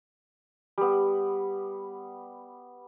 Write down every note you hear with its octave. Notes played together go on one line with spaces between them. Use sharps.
G3 B3